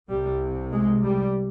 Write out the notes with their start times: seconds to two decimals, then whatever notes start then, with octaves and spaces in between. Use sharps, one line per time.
0.09 C2 C3 G3
0.72 G#3
1.03 G3